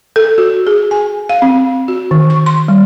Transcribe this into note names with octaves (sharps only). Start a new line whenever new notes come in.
A4
F#4
G#4
G#5
F5
C4
F#4
D#3
C#6
C6
G3